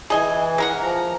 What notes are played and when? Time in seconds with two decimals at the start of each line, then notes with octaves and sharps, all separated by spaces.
0.10 E3 G#4 D#5 G#5
0.58 G#3 A#4 F#5
0.81 F3 A#5